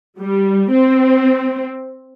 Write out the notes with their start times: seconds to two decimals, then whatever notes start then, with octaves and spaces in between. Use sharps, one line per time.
0.20 G3
0.72 C4